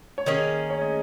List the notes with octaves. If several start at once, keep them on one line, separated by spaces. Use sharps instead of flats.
C#5
D#3 A#3 C#4 G#4 D#5
C#5
D#5